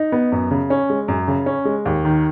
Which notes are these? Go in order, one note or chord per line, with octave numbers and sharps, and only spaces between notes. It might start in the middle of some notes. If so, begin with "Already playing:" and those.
Already playing: D#4
B3
F#2
C#3
C#4
G#3
F#2
C#3
C#4
G#3
D#2
D#3